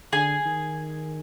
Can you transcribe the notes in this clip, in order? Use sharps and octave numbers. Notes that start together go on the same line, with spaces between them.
D3 G#4 G#5
D#3